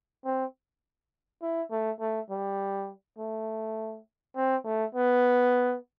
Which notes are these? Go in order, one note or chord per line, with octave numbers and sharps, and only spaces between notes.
C4
E4
A3
A3
G3
A3
C4
A3
B3